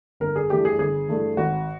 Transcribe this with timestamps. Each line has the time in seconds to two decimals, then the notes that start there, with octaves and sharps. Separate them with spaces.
0.20 G1 A#4
0.36 G#4
0.50 G2 E3 A3 G4
0.65 G#4
0.79 G1 G#4
1.08 G2 E3 A3
1.37 G#1 F#4